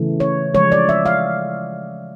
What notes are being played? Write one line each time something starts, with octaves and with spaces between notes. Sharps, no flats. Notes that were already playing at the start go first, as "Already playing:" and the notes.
Already playing: C#3 E3 A3
C#5
C#3 F3 G#3 C#5
D5
E5
F5